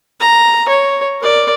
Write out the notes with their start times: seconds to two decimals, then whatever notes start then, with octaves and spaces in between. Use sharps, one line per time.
0.20 A#5
0.68 C#5
1.21 A#4 D5